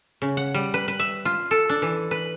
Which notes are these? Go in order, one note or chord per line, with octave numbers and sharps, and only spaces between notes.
C#3
F#5
G3
B4
B4
E5
F4
A4
D4
E3
B4